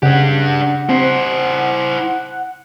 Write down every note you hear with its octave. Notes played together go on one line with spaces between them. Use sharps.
C#3 D4 G4 F#5
C4 E4 C5